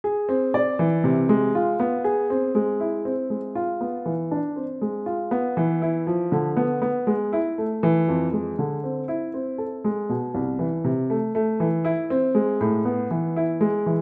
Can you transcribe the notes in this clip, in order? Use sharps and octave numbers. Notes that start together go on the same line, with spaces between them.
G#4
C4
D5
E3
C3
G#3
F4
B3
G#4
C4
G#3
E4
C4
G#3
F4
B3
E3
D4
C4
G#3
F4
B3
E3
E4
F3
D3
B3
B3
G#3
E4
A3
E3
F2
G#3
D3
C4
E4
C4
A4
G#3
B2
C2
E3
C3
A3
A3
E3
E4
C4
G#3
A2
B3
E3
E4
G#3
E3